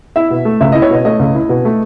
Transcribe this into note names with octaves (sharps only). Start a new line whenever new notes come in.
E4 E5
B2
A3
C#2 E5
E4 D#5
C#5
B2 D#5
A3 D#5
C#2
E4
B2
A3